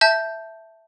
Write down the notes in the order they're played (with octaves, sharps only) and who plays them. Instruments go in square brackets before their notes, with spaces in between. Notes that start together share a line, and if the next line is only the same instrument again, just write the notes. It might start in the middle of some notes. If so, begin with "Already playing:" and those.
[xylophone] E5 A5 G6